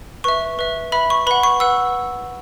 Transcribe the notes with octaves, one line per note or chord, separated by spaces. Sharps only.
B4 E5 C#6
B4 E5
B4 E5 B5
C#6
B4 F#5 B5
C#6
B4 F#5 E6